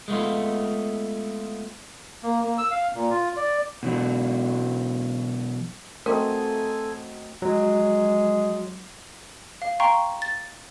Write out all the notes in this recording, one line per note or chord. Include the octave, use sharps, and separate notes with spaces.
G#3 A3 B3 F4
A#3
A#3
E6
F5
A#2
F4
D5
B2 E3 F#3
F#3 A3 C4 A4 A#4 D#5 G#5
F#3 G#3
F5
F5 G5 A#5 C6 C#6
A6